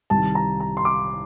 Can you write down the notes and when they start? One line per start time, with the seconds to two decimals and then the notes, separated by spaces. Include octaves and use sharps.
0.10 C2 C3 D#3 A5
0.35 A#5
0.60 A#5
0.77 C6
0.85 D6